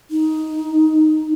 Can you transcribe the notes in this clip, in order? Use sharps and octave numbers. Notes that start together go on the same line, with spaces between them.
D#4